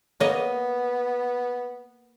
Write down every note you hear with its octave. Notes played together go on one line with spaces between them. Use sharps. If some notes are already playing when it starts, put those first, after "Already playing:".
A#3 B3 C#5 D#5